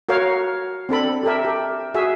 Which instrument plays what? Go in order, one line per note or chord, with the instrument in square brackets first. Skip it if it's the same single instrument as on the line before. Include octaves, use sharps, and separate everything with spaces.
[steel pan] F#4 A#4 C#5 F5
C4 D4 A4 B5
G4 A4 A#4 E5
G4
F#4 G#4 E5